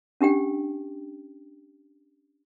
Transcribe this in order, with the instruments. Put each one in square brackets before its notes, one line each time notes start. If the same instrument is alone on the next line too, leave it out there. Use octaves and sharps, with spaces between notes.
[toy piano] C#4 D4 G4 G5